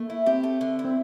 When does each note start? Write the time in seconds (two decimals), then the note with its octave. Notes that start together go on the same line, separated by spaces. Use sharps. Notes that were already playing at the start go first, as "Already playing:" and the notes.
Already playing: A3 A#3
0.10 E4
0.26 C4 G4
0.43 A3
0.61 D3
0.79 E4
0.85 C4